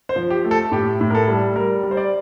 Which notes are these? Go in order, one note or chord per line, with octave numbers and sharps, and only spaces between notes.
C5
F3
G4
A3
A4
A2 G4
A2
A#4
A4
G3
G3 A#4
G3
C5
D5